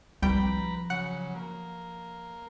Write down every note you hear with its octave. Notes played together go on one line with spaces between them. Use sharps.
C2 F3 G3 B4 G5 A#5 B5
C#3 F#3 F#5
A#3